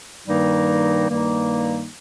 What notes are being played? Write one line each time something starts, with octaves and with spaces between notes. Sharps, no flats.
G2 D#3 G3 A#3 D#4
G2 D#3 G3 A#3 D#4